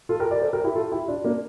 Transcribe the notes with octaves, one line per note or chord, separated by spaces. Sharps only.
F4 A4
G4 A#4
A#4 D5
A4 C5
G4 A#4
E4 G4
F4 A4
E4 G4
D4 F4
A#3 D4